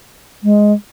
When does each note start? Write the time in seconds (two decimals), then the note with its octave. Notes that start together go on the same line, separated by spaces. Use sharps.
0.44 G#3